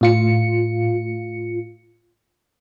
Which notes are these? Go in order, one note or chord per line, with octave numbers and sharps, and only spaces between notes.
A2 F4 C#7